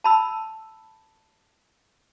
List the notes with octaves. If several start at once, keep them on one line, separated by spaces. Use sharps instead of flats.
A5 B5 E6